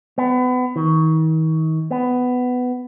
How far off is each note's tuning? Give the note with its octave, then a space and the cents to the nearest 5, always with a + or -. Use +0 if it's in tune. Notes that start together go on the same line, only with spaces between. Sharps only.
B3 +30
D#3 +40
B3 +15